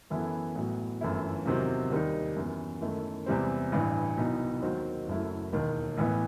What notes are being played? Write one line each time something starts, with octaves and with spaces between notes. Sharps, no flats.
F#2 E3 B3 E4 A4
A1 A2 F#3 B3
G1 F#2 E3 A3 E4
E2 C3 D#3 F#3 C4
D#2 D#3 G3 D#4
F#2 E3 B3
F#2 D#3 A3 E4
E2 C3 E3 G3 C4
A1 G2 E3
C2 B2 F#3 B3 D#4
D#2 D#3 F#3 C4 F#4
F#1 F#2 F#3 A3 E4
E1 D#2 D#3
A1 A2 E3 B3